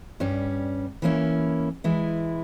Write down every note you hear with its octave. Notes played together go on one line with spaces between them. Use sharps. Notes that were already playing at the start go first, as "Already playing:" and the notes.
G2 G3 C#4
E3 A#3 C#4 E4
E3 G#3 E4